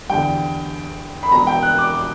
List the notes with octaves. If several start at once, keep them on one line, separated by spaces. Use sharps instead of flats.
E2 D3 G3 G5
B5
E1 E2 B2 A#5
G5
F#6
D6
D6